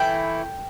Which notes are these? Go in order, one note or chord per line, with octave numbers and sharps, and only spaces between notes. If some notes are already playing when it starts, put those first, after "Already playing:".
Already playing: E3 A3 E4 G5